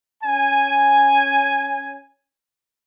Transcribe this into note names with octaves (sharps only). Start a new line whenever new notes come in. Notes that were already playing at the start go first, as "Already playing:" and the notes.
C#4 G#5